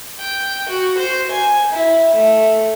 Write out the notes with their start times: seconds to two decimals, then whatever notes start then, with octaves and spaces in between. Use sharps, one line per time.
0.19 G5
0.69 F#4
0.98 C5
1.31 G#5
1.72 E4
2.14 A3